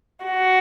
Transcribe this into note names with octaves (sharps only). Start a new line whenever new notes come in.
F#4